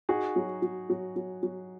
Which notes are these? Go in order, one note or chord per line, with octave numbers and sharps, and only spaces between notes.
D#4 F#4 G#4
F#3
F#3
F#3
F#3
F#3